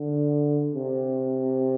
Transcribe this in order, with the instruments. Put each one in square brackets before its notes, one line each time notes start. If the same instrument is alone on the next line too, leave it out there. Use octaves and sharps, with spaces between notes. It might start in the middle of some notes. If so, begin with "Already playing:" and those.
Already playing: [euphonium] D3
C3